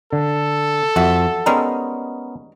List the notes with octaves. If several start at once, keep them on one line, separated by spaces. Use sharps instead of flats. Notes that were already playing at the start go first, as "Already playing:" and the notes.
D3 A4
F2 F#4 E5
G3 G#3 B3 C#4 D#4 A#4